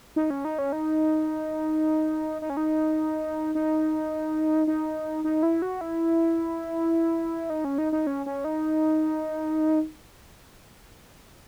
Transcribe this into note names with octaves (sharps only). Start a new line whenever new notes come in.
D#4
C#4
D#4
C#4
D#4
D#4
C#4
D#4
D#4
D#4
D#4
E4
F#4
E4
D#4
C#4
D#4
D#4
C#4
C#4
D#4